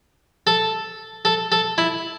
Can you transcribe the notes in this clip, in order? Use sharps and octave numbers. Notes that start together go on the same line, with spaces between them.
A4
A4
A4
E4